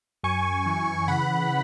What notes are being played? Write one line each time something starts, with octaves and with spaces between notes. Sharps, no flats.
F#2 G#5 C#6
E3
C#3 F#5 B5